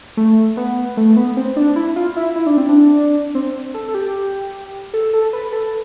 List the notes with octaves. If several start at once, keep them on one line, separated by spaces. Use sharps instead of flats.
A3
B3
A3
B3
C4
D4
E4
F4
E4
E4
D4
C4
D4
C4
A4
A4
G4
A4
A4
B4
A4